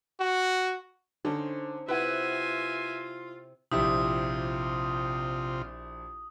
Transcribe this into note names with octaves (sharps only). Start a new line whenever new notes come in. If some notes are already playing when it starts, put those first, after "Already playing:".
F#4
D3 C#4 D#4 C5
C3 E4 F4 B4 E5 F#5 G#5
A#1 C3 E4 F4 G4 D#6